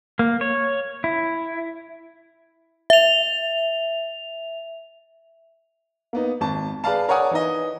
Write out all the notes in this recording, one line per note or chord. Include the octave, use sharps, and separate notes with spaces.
A#3
C#5
E4
E5 F7
A#3 B3 D#4
G#1 A5
G#4 B4 D5 F5 A5
A#4 C#5 D5 F#5 G#5 D#6
E3 D#4 D#5